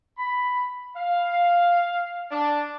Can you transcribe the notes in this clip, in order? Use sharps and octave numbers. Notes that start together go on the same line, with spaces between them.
B5
F5
D4